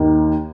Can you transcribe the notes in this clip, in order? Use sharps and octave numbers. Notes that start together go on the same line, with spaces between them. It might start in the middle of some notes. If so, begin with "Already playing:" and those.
Already playing: D#2 D#3